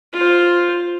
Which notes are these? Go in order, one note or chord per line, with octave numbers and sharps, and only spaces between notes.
F4 C5